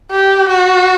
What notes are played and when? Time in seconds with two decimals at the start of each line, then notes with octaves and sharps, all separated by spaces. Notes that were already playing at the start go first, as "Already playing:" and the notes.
0.11 G4
0.49 F#4